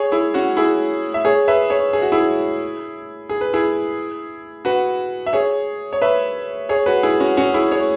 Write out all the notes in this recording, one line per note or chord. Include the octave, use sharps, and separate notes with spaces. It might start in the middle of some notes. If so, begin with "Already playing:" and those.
Already playing: G#4 C#5
E4 G#4
C#4 F#4
E4 G#4
E5
G#4 C#5
B4 E5
G#4 C#5
G#4
F#4
E4 G#4
G#4
B4
E4 G#4
F#4 B4
E5
G#4 C#5
C#5
B4 E5
G#4 C#5
F#4 B4
E4 G#4
C#4 F#4
C#4 F#4
E4 G#4
G#4 C#5